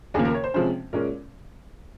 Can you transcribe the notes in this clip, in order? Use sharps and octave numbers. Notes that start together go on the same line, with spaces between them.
D#2 C#3 F3 A#3 G#4
A#4
C#5
C5
C3 F3 G#3 C#4 C5
A#2 G#3 C#4 A#4